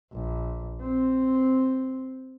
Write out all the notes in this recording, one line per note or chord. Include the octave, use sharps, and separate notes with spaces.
A#1
C4